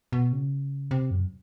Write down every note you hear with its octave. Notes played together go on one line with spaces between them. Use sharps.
B2
C#3
C3
F#2